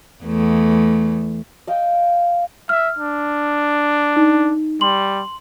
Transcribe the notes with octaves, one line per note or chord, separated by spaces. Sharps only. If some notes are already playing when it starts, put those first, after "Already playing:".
E2 A3
D#5 F5 G5
E5 F6
D4
D#4
G3 C6 F#7